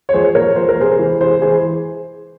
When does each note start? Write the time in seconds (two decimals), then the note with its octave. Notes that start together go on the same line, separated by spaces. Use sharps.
0.09 C#5
0.13 F3 G#4 C5
0.35 A#2 A#4 C#5
0.56 F3 C5
0.69 A#4
0.78 C3 G#4 C5
0.99 E3
1.21 C3 G#4 C5
1.42 E3 G#4 C5